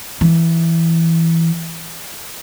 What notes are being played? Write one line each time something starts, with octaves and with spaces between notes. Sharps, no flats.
E3